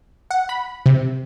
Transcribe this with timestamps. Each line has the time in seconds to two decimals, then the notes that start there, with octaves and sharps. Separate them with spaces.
0.31 F#5
0.49 B5
0.86 C3